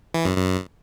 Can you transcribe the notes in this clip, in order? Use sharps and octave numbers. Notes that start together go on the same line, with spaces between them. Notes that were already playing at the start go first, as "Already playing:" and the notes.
E3
F#2
F#2